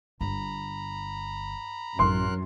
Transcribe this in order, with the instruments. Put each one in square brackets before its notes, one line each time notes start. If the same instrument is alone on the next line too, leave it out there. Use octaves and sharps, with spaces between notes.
[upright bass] G1 [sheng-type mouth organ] A#5 B5
[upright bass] A1 [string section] F#2 [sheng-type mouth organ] A#4 F#6 [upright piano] C6